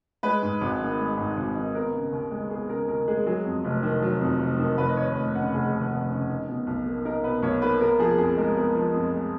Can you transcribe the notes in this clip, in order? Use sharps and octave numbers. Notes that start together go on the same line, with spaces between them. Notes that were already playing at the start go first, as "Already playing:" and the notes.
G#3 B4
G#2
G#1
D#3
G#3
G#2
G#1
D#3
B3 A#4
C#3
D#2
G#3
B3 G#4
C#3 A#4
D#2 A#4
G#3 G#4
F#3 G#4
F2
F1
D#3
F#3
F2
F1
D#3
F1 B4
D#5
D#2 C#5
F1
C#3 F#5
F1 G#4
D#2
F1
C#3
D#4
B2
B1
A#3
D#4 A#4
B2 B4
B1 C#5
A#3 B4
B3 A#4
F3 G#4
F2 G#4
G#3 A#4
B3 A#4
F3
F2
G#3